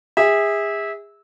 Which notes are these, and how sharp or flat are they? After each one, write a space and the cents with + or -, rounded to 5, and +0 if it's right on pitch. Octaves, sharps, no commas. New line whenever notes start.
G#4 -30 E5 -20